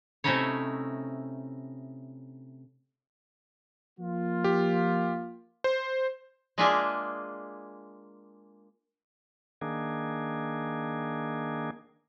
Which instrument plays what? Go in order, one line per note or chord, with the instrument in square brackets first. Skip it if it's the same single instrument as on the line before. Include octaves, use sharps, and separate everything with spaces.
[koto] C3 A3 C#4 D#4 E4 C#5
[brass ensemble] F3 A#3 F4
[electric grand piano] G4
C5
[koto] G#3 A#3 D4 F4 G#4 E5
[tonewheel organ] D#3 A#3 D4 G#4